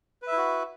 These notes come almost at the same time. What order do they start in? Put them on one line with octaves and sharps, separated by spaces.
B4 E5 E4 F#4